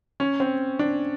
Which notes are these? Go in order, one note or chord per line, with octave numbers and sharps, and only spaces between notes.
C#4
C4
D4